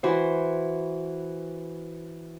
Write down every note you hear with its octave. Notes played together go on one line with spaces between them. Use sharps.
E3 F#4 C5